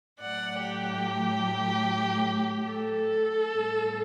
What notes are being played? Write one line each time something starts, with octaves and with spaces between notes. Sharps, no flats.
A2 F#3 A3 D5 F#5
G4
A4
A2 G3 B3